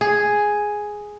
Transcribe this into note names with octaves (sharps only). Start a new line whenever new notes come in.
G#4